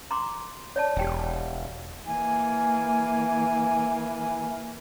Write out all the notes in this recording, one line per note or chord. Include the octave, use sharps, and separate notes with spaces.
A#5 C6 D6
C#5 D5 A5
E1 G4 G5 G#5
E3 A#3 G#5